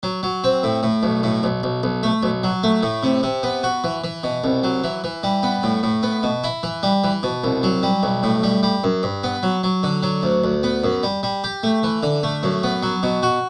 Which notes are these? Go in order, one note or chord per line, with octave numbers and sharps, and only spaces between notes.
F#3
F#3
C4
A2
A2
B1
A2
B1
B1
B1
A3
B1
F#3
A3
A2
C3
C3
B3
F#4
E3
E3
B2
C2
F#3
E3
E3
G3
B3
A2
A2
B3
B2
E4
E3
G3
E3
B2
C2
F#3
G3
B1
A2
G3
G3
F#2
G2
B3
F#3
F#3
D3
F#3
D2
D2
B3
F#2
G3
G3
G4
A3
E3
D3
A3
F#2
B3
F#3
B2
F#4